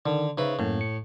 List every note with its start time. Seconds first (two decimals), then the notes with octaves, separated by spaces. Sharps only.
0.06 D3 D#3
0.38 C#3 D#4 B4 C5 E5
0.59 F#2 A2 A#3
0.81 C#7